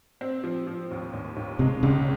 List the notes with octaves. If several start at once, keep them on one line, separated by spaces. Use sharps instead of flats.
C4
F3
F3
D#2
D#2
D#2
C3 G#3
C#2 C#3